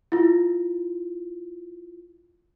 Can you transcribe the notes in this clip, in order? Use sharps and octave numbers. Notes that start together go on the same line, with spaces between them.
E4 F4